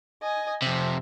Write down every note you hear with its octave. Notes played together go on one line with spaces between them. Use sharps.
D#5 G#5
F2 C3 E5